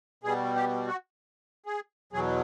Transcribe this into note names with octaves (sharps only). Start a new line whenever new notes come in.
B2 G3 G#4
G4
F#4
G#4
E2 B2 F#3 G#4